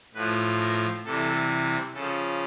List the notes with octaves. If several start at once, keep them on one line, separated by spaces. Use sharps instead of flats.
A2 F3 B4
A#4
C3 E3 G3 A4
C#3 F3 A4